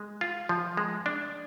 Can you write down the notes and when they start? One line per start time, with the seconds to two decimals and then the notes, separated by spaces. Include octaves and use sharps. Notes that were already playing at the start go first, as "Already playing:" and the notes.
Already playing: G#3
0.21 F4
0.49 F3
0.77 G#3
1.06 D4